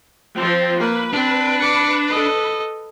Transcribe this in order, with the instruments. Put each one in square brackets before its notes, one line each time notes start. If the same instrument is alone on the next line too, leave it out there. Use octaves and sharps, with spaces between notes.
[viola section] F3 C4
[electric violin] A#3 [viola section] B4
[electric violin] C4 [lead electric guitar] D4
[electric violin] D6 C#7
A4 D#5